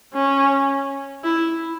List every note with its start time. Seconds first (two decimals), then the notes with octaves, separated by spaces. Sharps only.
0.13 C#4
1.24 E4